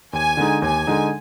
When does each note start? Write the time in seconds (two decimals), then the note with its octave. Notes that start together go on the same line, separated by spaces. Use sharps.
0.13 D#2 G#5
0.37 D3 G#3 D#4
0.62 D#2 G#5
0.87 D3 G#3 D#4